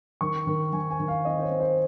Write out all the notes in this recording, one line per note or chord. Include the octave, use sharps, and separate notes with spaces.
D#3 C#6
D#3
D#3 G#5
G#5
D#3
F5
C4 D#5
C5
C#5
C4
C5